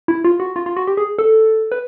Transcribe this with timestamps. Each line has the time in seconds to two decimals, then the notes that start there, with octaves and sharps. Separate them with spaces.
0.08 E4
0.24 F4
0.40 F#4
0.56 F4
0.66 F4
0.76 F#4
0.87 G4
0.97 G#4
1.19 A4
1.72 B4